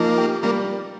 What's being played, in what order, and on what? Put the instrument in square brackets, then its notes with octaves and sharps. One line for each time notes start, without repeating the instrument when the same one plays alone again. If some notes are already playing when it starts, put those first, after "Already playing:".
Already playing: [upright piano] F3 D#4 [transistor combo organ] A#3
[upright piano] G4
[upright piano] G3 [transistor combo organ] A#3